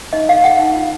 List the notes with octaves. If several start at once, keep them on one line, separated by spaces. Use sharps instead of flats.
D#4 D#5
A4 F5
A4 F#5
D#4
F4